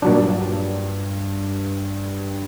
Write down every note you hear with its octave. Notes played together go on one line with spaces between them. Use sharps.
G2 A#2 F#3 D4